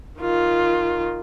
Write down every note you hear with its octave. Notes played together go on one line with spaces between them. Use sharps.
D#3 F4